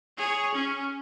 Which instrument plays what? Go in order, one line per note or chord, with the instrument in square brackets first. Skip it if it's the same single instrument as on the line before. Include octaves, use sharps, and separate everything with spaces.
[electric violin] G#4 C#5
C#4